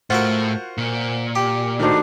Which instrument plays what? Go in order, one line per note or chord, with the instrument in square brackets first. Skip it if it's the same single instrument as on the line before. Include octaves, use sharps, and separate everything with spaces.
[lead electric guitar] A2 [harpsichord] F4 F#4 A#4 [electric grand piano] C5 F#5
[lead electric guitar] A#2
[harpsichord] G4
[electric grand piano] D#3 A3 D#4 [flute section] D4 F#4 C5